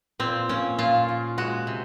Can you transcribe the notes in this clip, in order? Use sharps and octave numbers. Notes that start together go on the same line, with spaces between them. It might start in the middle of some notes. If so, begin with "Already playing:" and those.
A#2 C4
A#2 C#4
A#2 F4
A#2
G#3 F#4
C3